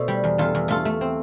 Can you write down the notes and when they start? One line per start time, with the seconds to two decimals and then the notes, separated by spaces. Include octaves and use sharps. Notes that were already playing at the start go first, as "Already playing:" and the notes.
Already playing: B2 A3 A4 C5 D5
0.08 G3
0.24 E2
0.38 E2 F4 A4
0.55 E2
0.68 A3 F4 A4
0.85 A3
1.01 C4